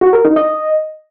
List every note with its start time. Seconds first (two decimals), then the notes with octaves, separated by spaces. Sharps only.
0.01 F#4
0.13 A#4
0.25 D#4
0.36 D#5